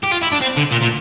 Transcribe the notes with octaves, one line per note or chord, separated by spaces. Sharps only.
G4
F4
E4
D4
C4
D3
A#2
A#2